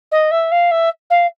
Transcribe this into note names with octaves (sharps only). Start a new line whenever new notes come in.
D#5
E5
F5
E5
F5